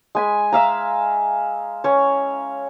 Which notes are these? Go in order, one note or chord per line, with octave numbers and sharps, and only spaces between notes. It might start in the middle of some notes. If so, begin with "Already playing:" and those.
G#3 G#5 B5
E5 F5 A#5
C#4 C#5